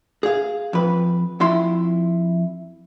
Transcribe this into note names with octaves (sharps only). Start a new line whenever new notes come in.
G#4 F5
F2 B4
F2 E4 C6